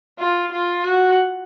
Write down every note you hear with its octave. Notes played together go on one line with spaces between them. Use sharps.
F4
F4
F#4